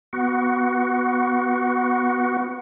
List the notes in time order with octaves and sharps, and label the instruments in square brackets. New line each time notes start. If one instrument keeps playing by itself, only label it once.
[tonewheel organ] B3 F#4